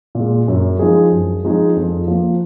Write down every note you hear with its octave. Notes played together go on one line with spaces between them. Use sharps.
A#2 G#3
F#2
F3 G#3 D#4 G#4
F#2
F3 G#3 D#4 G#4
F2
F3 A#3